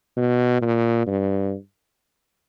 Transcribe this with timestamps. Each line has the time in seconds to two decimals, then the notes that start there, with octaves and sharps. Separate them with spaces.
0.16 B2
0.62 A#2
1.07 G2